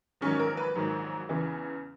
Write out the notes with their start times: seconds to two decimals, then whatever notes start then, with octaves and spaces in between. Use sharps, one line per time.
0.21 A#1 G#2 D#3 F#3 C#4
0.39 A#4
0.57 B4
0.75 A#1 G#2 D#3 F#3
1.29 E2 C#3 E3